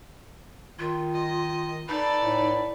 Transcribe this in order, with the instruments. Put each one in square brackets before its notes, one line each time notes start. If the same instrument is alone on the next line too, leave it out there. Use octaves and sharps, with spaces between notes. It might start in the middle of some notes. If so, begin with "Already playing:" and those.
[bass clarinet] D#3 [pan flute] F4
[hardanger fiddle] D#5
[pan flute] D#4 [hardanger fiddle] A4 D5 [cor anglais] B4
[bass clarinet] A2